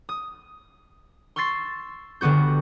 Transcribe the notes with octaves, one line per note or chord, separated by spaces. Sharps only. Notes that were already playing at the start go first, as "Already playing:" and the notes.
D#6
C6 C#6 E6 A6 C7
G1 D3 B3 F#4 G6